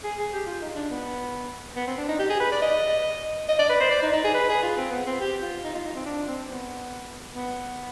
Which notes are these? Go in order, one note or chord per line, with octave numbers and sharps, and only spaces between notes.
G#4
G#4
G4
F4
D#4
D4
B3
B3
C4
D4
D#4
G4
G#4
B4
D5
D#5
D#5
D5
B4
C5
D5
D#4
D#4
G#4
B4
G#4
F4
C4
B3
C4
G4
F4
D#4
F4
D#4
C4
D4
C4
B3
B3